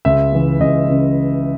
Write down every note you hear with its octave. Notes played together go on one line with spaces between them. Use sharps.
C#2 E5
C#3 E3
C#2 D#5
C#3 E3